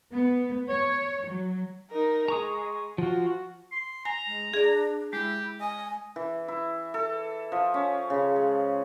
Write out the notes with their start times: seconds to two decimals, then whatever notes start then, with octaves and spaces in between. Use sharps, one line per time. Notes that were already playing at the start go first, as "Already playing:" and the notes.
0.11 B3
0.69 C#5
1.27 F#3
1.91 D#4 A#4
2.28 G#3 A#5 C#6 D#6
2.98 F3 F4 F#4
3.72 C6
4.05 G#5 A#5
4.27 G#3
4.54 D4 G#4 D5
5.13 G#3 E4 G4
5.61 D#5 G#5
6.16 E3
6.48 E4
6.94 A4
7.52 F3
7.74 C#4
8.10 C#3
8.36 G#3